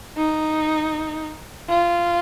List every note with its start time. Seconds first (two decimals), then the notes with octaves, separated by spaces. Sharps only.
0.17 D#4
1.69 F4